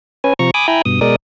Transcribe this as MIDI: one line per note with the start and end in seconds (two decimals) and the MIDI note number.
0.24 0.33 61
0.24 0.33 71
0.24 0.33 80
0.39 0.51 48
0.39 0.51 53
0.39 0.51 82
0.39 0.51 85
0.54 0.67 80
0.54 0.67 83
0.54 0.67 86
0.54 0.67 87
0.68 0.82 64
0.68 0.82 79
0.68 0.82 80
0.68 0.82 82
0.68 0.82 83
0.85 1.00 43
0.85 1.00 47
0.85 1.00 87
1.01 1.16 47
1.01 1.16 56
1.01 1.16 70
1.01 1.16 74
1.01 1.16 87